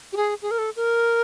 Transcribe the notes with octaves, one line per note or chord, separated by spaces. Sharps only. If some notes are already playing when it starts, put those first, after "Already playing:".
G4
G#4
G#4
A#4
A4
A#4